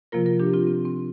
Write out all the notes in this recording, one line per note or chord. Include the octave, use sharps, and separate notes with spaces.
C3 F3 A#3 F4 A#4
F4 A#4
D4 G4
C4 F4
C4
C4